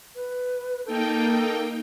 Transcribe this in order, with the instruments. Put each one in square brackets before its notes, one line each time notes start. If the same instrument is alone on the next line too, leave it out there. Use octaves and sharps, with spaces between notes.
[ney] B4
[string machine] A#3 D#4 G5 [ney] A4